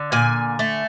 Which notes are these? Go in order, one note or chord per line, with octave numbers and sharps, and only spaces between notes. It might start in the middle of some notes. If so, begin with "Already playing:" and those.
Already playing: D3
A#2 G#5
A3